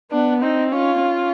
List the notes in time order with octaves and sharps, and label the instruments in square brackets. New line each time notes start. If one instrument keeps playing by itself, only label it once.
[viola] B3 [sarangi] D4
[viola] C4 [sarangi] D#4
[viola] C#4 [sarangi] F4
[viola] C#4